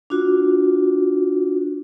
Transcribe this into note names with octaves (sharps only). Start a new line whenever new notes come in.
D4 F4 F#4